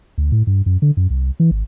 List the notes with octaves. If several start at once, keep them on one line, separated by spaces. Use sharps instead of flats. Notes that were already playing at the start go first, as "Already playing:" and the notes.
D2
A2
G2
F#2
D3
F#2
C2
E3
G#1